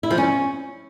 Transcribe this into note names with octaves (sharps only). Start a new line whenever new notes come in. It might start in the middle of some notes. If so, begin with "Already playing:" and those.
E4
F3
C#4